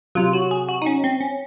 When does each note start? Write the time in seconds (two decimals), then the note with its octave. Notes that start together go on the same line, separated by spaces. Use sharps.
0.15 C3 F#3 F4
0.33 F#4
0.51 G#4
0.69 F#4
0.82 D#4
0.86 C#4
1.04 C4
1.21 C#4